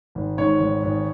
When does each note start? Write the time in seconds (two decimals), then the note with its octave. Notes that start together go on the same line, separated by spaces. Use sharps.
0.15 G#1
0.38 G#2 C#5
0.61 G#1
0.83 G#1